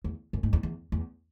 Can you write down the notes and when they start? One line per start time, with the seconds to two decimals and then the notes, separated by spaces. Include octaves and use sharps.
0.04 E2
0.33 F#2
0.43 G#2
0.53 E2
0.63 E2
0.92 E2